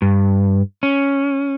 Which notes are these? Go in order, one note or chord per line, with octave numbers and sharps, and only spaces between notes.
G2
C#4